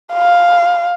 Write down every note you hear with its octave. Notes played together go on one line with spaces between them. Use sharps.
F5